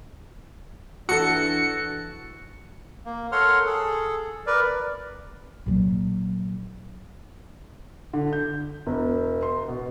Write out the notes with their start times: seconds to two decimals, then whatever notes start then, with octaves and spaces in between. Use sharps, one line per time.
1.09 E3 D4 F#4 A4 C#7
3.06 A#3
3.32 A4 A#4 C#5 F#5 C6 F6
3.65 G#4 A4
4.46 A#4 B4 D5
5.66 A#2 F#3
8.14 D3
8.33 G6
8.86 E1
9.43 C6
9.68 B2